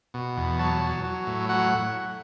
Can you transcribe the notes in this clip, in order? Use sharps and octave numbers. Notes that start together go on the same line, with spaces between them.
B2
E2
F#3 A5
F#3
F#3
A2
F#3 F#5